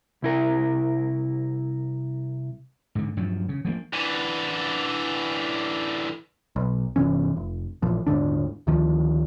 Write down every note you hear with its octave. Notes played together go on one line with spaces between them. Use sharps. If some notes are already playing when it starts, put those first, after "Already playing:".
C2 E4 A#4
G#2 D3
G2 F3 F#3
C#3
F3 G3 A#3
D3 E3
B1
G1 C3 E3 C#4
F1
A1 A#2 F3
D#1 G#2 D3 D4
D2 D#3 F3